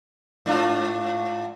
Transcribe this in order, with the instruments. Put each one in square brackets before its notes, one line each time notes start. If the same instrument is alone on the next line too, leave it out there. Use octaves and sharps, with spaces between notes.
[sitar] G#2 D4 F4